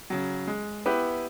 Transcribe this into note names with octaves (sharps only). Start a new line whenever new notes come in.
C#3 F#3
G#3
B3 E4 G4 B4